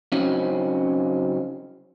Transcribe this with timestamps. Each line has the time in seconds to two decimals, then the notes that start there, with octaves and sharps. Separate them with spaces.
0.12 C#3 F#3 C4 C#4 D#4